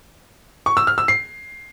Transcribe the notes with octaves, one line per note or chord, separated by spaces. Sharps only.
C#6
E6
F6
E6
C7